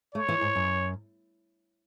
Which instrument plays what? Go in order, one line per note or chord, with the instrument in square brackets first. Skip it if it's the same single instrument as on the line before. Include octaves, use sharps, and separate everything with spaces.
[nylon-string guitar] A3 [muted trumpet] C#5
[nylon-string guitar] E3
G#2
F#2